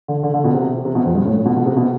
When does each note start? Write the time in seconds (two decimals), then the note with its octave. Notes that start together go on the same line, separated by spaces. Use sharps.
0.08 D3
0.23 D3
0.34 D3
0.44 B2
0.54 C3
0.85 C3
0.95 B2
1.05 F2
1.15 G2
1.25 A2
1.36 A2
1.46 B2
1.56 B2
1.66 C3
1.76 B2